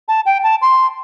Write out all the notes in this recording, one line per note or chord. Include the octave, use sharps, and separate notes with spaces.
A5
G5
A5
C6